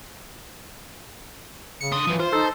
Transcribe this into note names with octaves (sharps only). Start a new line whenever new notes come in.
C#3 C#7
D3 C6 D#6
F#2 E3 F3
F4 C5
D#4 A4